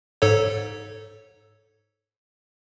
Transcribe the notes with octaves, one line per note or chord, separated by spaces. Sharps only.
G#2 A4 C#5